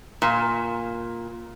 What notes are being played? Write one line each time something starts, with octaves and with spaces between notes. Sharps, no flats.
A#2